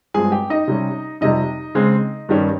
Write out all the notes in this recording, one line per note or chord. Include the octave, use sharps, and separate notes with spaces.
G2 F3 G#3 C4 G#4 G#5
G4 G5
D#4 D#5
C3 G3 C#4
F2 C3 G3 D#4 D#5
C#3 G#3 C4
G2 D#3 G3 C#4